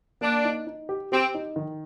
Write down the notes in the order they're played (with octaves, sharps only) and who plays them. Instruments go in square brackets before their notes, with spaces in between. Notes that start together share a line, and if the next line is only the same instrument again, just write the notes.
[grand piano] A#3 [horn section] D4
[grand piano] D#4
D#4
G4
[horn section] C4 [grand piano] G4
[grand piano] D#4
D#3